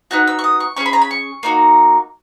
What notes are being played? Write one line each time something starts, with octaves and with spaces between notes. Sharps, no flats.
B3 D#4 F#4 F#6
E6
C#6
D#6
C#6
C#4 G#4 C#6
B5
A#5
B5
C#6
A#3 D#4 F#4